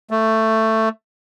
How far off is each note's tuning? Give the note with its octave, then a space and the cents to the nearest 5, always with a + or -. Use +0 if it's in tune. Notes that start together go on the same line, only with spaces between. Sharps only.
A3 +10